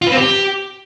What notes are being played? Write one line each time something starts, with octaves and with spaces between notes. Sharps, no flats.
F4
B4
C4
G4